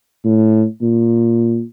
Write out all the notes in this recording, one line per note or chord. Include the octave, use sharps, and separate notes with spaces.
A2
A#2